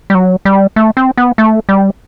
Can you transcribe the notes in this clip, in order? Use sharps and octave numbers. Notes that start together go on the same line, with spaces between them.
G3
F#3
G3
A3
C4
B3
A3
G3